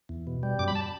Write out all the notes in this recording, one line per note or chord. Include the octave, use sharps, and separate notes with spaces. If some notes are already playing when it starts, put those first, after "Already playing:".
E2
B2
G3
F#2 D6
B5
A5